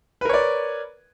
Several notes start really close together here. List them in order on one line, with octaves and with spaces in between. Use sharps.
B4 A#4 C#5 D5